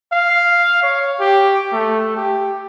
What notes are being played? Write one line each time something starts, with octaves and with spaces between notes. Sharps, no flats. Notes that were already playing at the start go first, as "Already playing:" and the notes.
F5
C#5
G4
A3
G4